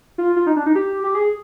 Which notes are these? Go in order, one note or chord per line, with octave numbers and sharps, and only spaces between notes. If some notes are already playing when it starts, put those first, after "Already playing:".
F4
F4
D#4
D4
D#4
G4
G4
G#4